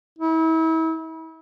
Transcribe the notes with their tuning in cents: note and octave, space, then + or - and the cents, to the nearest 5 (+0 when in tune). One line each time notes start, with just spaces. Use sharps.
E4 -35